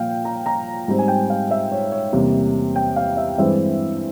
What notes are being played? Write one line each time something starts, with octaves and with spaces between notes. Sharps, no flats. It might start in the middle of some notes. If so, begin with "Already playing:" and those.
Already playing: A#2 F3 A#3 F5 G5
A#5
A#5
G#2 G3 C4
G#5
G5
F5
E5
C#5
C#5
E2 C3 G3 A#3
G5
F5
E5
G2 E3 G#3 C4 E5